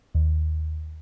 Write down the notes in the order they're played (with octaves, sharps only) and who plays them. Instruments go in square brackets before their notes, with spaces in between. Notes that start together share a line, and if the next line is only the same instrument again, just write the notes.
[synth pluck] D#2